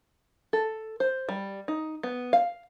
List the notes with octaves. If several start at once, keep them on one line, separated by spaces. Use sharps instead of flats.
A4
C5
G3
D#4
B3
F5